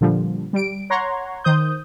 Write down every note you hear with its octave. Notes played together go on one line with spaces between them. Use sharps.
A#2 D3 F3 G3
G3 D7
C#5 F#5 A#5 C6 C#6 G#6
D#3 C5 D#6 G6